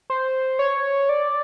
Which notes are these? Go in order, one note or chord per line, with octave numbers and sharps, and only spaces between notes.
C5
C#5
D5